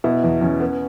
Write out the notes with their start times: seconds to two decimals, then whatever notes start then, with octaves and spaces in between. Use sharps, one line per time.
0.04 B2 E4
0.23 E2
0.41 E2 C#4
0.60 B3